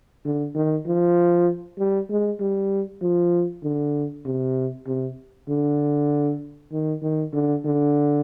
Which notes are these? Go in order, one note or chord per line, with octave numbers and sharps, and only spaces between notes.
D3
D#3
F3
G3
G#3
G3
F3
D3
C3
C3
D3
D#3
D#3
D3
D3